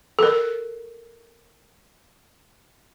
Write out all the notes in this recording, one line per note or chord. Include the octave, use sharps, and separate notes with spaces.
A4 A#4